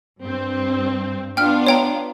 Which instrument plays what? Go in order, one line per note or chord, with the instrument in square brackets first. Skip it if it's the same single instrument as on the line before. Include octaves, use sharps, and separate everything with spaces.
[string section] G2 C4
[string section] B3 D4 F4 [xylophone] G5 F6
[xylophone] C#5 G5 A#5